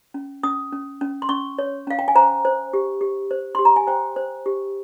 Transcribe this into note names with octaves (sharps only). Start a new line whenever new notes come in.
C#4
C#4 D#6
C#4
C#4
C6
C#4 C#6
C#5
C#4 F5
G5
G#5
C5 A#5
C5
G4
G4
C5
G4 C6
A#5
G#5
C5 G5
C5
G4